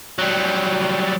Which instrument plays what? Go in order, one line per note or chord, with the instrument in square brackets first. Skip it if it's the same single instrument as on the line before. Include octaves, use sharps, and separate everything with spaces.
[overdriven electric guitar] F#3 G3